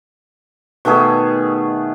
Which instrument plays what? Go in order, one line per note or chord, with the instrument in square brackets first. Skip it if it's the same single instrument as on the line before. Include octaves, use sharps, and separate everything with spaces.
[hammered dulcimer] B2 D#3 A3 G#4